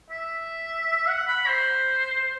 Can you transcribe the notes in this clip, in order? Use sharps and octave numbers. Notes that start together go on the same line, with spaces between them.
E5
F#5
B5
C5